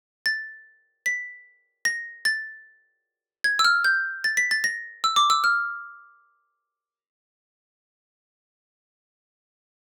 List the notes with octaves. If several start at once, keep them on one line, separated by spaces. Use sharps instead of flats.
A6
B6
A#6
A6
G#6
E6
F6
G6
A6
B6
A6
A#6
E6
D6
E6
F6